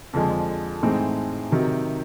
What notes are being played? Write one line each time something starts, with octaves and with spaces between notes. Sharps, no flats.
F2 D3 F3 G#3
A2 E3 G#3 C4 D#4
C3 D#3 F#3